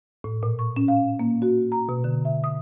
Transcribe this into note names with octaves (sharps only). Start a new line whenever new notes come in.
A2
A#2
C#6
C#4
F5
A#3
F#4
A#5
B2
D3
E5
D#6